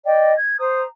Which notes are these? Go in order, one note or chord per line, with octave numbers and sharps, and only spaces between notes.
D5 D#5 G5
G#6
C5 A#5 D#6